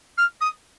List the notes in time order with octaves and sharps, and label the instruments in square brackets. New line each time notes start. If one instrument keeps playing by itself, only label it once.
[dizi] F6
D#6